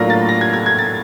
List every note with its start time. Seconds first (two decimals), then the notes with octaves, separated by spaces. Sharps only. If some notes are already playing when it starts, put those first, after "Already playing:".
Already playing: A2 F#3 A#3 D4 F4 A#6
0.10 A6
0.29 A#6
0.41 G#6
0.53 G#6
0.66 G#6
0.79 A6